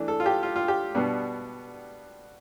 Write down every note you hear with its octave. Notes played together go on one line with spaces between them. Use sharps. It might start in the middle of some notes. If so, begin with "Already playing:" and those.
Already playing: E3 A3 D4
A4
F4
G4
F4
F4
G4
B2 G3 B3 D4